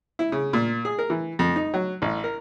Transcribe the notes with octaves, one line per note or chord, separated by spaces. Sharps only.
E4
C#3
A#2
G#4
A#4
E3
F2
D#4
F#3
A1
A#4